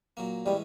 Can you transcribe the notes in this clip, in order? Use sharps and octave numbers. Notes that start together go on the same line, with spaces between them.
A#2 F#3 A#3
A2 E3 G3 G#3 C#4